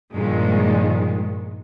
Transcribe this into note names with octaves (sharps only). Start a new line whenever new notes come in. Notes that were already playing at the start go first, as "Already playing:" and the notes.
G2 A#2 D#3 F3 G#3